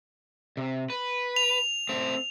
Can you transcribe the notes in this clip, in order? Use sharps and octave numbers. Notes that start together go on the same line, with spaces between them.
C3
B4
F7
A3 C4 C5